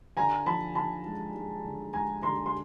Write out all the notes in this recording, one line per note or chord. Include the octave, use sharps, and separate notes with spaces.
D3 G#5 A#5
F3 A5 B5
D3 A5 B5
G#3
G#3
D3
G#3 G#5 A#5
D3 A#5 C6
C6